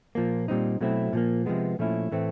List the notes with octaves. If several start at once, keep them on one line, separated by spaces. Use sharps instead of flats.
A#2 F3 A#3
A#2 G3 C4 D#4
B2 F#3 A3 C4 E4
A#2 F3 A#3
C3 F3 G#3 B3
A#2 F3 A3 C#4 E4
A2 E3 A3 C4